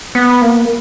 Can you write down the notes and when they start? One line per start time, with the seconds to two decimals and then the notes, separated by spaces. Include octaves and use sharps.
0.15 B3
0.41 A#3